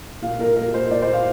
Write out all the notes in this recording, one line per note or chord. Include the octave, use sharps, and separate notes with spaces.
A#2 F5
A#2 A#4
A#2 A#4
A#2 C5
A#2 D5
C5
A#2
F5